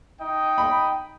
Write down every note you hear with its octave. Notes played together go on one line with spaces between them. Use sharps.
D#4 D#5 G5
B5